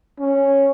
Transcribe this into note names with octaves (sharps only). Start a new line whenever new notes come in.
C#4